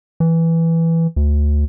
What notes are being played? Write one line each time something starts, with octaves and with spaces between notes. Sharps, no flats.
E3
D2